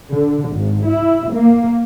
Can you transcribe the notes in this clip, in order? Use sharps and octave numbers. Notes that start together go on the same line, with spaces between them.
D3
G#1
E4
A#3